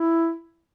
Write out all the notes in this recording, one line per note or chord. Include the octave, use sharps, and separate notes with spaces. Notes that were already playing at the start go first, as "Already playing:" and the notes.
Already playing: E4